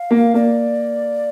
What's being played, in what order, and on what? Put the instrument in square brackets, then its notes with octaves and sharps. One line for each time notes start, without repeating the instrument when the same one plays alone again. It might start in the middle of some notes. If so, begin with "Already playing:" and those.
Already playing: [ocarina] F5
[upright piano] A#3
[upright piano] A#3 [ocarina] D5